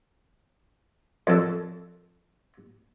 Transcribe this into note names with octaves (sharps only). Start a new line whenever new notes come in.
F2 A4